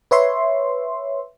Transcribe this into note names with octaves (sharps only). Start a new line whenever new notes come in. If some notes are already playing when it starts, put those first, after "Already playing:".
B4 C#5 E5 C6